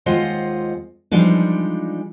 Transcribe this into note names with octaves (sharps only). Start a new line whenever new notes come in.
D#2 G#3 F4 C5 D#5 F#5
E3 F3 G3 G#3 D4 D#4